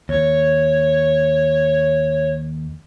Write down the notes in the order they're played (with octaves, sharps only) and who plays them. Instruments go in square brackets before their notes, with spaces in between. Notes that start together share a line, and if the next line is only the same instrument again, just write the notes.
[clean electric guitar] D#2 [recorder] C#5